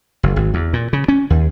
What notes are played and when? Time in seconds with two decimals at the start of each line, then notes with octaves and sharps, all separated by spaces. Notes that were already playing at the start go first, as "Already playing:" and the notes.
0.23 F#1
0.36 G#1
0.54 E2
0.73 A#2
0.93 C#3
1.08 C#4
1.30 D#2